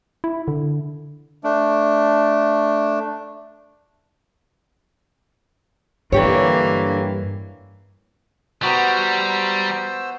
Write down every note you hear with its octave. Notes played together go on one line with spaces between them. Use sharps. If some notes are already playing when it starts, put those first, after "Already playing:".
E4
D3
A3 D4
G2 D3 E3 A#3 G4 C#5
G3 B3 F#4 C5 A#5 E6